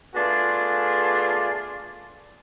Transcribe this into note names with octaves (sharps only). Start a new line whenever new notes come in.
A3 B3 D4 F4 G#4